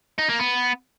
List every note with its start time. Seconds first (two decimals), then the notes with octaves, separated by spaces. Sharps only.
0.18 D#4
0.29 A#3
0.40 B3